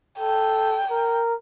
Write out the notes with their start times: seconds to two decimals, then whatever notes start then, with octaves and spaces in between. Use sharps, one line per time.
0.19 A4 G5
0.91 A#4